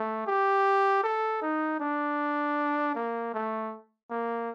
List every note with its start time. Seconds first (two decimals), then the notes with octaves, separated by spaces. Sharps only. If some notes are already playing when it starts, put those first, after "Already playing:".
Already playing: A3
0.27 G4
1.04 A4
1.42 D#4
1.80 D4
2.95 A#3
3.34 A3
4.10 A#3